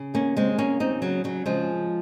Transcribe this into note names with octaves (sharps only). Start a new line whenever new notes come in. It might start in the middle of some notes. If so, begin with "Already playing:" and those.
Already playing: C#3
D#2 A#3 C#4
C#3 G#3 C4
C#3 A#3 C#4
D#2 C4 D#4
C#3 F#3
C#3 F#3
C#3 F3 G#3